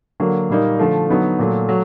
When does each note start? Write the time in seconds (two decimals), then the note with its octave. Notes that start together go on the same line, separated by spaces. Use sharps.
0.20 D3 F#3 A#3
0.49 A#2 G3 A#3 D#4
0.79 D3 F3 A3
1.09 D3 F#3 B3 D#4
1.39 A#2 F#3 A3
1.69 F#3 A3